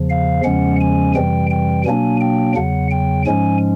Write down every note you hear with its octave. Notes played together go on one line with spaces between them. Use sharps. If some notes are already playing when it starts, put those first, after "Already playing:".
Already playing: E2 C#3 F3
F5
E2 C#3 F3 G#3 C#4 F#5
G#5
F2 C3 E3 G3 G5
G5
B2 F#3 A#3 D4 G#5
G5
E2 C#3 F#3 F#5
G5
G#2 F3 G#3 C#4 G#5